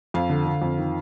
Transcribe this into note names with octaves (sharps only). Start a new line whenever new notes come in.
F2 F5
D3
D3
F2
D#3